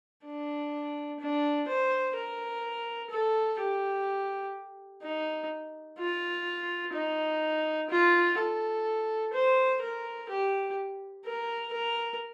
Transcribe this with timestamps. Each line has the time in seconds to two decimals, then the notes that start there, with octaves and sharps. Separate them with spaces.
0.25 D4
1.20 D4
1.68 C5
2.16 A#4
3.11 A4
3.59 G4
5.03 D#4
5.99 F4
6.94 D#4
7.91 F4
8.38 A4
9.33 C5
9.82 A#4
10.30 G4
11.26 A#4
11.73 A#4